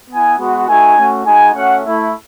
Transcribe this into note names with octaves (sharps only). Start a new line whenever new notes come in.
B3 E4 G#5
G#3 B3 F#4
A3 D#4 F#4 G#5
A3 C#4 F#4
G#3 D#4 F#4 G#5
A3 C#4 F#4 F#5
A3 E4